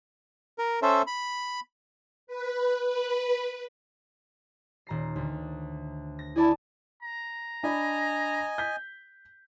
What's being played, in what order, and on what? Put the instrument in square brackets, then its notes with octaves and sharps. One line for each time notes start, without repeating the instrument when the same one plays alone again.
[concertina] A#4
C#4 A4 C5 E5
B5
[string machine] B4
B4
[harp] D#1 A#5 C7
D2
A#6
[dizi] E4 [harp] G#4 D5 A5
[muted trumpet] A#5
[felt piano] D4 D5 B5 [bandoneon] D#5 G#5
[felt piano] G6 B6